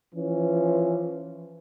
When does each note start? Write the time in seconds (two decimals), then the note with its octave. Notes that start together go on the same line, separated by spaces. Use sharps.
0.15 E3 F3 C#4